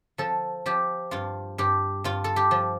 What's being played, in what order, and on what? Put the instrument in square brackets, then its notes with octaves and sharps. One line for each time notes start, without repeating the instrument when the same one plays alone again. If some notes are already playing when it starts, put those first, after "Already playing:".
[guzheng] F3 A4
F3 G4
G2 F4
G2 G4
G2 F4
A4
G4
F3